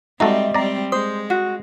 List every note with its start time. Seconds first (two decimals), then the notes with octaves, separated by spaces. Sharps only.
0.20 G3 G#3 C4 D#4 F#4 A4 D#5 E5
0.54 G3 C4 D5 A#5
0.92 G#3 C5 D#6
1.30 F#4